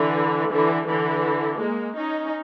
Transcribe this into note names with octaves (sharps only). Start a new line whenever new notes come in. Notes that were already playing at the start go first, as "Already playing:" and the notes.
Already playing: D3 E3
D3 E3
D3 E3
G#3 A#3
C#4 D#4